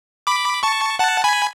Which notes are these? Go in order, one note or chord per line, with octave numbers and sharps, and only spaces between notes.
B5 D6
A5 C#6
F#5 A5
G#5 B5